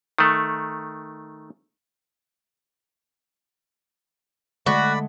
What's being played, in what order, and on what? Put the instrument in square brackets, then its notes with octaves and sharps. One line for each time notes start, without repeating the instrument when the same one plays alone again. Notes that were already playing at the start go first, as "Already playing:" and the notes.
[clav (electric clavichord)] D#3 A3
[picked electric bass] D3 G#3 A3 [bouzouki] F#4 [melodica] D5 B5